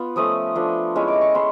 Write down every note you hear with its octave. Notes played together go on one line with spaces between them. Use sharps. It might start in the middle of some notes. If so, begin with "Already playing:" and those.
Already playing: B3 F4
F3 A3 C#4 D#6
F3 A3 D4
G#3 C#4 E4
D6
C#6
G#3 C#4 E4 C6